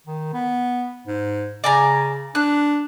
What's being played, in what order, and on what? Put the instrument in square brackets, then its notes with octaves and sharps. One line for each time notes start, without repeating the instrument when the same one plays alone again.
[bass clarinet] D#3
B3
G#2
[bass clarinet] C#3 [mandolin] D5 G#5 A#5
[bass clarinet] D4 [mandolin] F#6